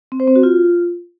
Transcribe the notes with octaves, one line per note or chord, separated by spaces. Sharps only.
C4
C5
C4
F#4
F4